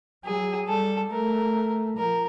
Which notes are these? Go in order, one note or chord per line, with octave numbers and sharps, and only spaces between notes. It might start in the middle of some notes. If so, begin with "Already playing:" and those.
F#3 G#4
G3 A4
A3 A#4
F3 A#4